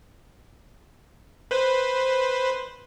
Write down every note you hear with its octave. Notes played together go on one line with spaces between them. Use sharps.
B4 C5